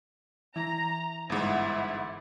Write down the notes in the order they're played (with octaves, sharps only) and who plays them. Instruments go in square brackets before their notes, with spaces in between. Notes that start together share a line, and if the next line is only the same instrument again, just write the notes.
[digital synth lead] E3 [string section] A#5
[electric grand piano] G1 G#2 [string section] E4 F#5